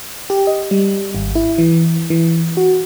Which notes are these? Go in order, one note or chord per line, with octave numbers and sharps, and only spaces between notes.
G4
D#5
G3
G#1
E4
E3
E3
F#4